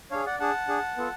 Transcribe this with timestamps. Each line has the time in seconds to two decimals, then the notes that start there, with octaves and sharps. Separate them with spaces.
0.11 D4 G#4 C#5 F5
0.26 D5 F#5
0.40 D4 G#4 F#5 A5
0.68 D4 G#4
0.97 B3 F4 A4